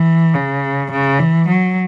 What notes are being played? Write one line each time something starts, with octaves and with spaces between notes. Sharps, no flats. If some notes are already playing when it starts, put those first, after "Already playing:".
Already playing: E3
C#3
C#3
E3
F#3